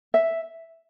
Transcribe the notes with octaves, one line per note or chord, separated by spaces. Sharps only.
E5